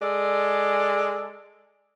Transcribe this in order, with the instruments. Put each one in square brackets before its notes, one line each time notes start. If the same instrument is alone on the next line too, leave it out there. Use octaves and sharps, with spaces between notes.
[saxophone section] G#3 A4 D5